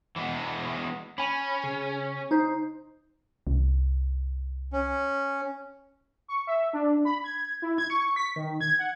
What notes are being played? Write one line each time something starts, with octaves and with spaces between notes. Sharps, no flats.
E3 G#3 B3
C#4 G#5 B5
C#3
D#4 C5
C2
C#4
C#6
E5
D4
B5
G#6
E4
G#6
C#6
B6
D#3
G#6
F#5